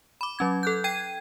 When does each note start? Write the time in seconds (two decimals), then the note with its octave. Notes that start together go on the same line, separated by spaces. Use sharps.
0.21 B5 D6
0.39 F#3 C#4 G#6
0.63 A4 F#6 G6
0.84 G5 G#6 D#7